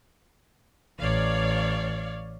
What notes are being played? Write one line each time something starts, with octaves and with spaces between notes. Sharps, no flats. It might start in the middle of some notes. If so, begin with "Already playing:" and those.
A1 C#5 D5 F5